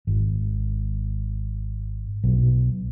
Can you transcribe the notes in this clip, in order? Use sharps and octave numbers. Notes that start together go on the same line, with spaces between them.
G#1
B1